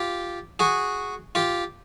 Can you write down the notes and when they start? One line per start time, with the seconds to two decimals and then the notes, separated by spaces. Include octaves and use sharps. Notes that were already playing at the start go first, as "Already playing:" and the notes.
Already playing: F4 G4
0.59 F#4 G#4
1.35 F4 G4